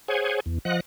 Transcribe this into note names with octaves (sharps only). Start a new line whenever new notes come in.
G#4 C5 C#5 F#5 G#5
E2
F3 D#5 F#5 F#6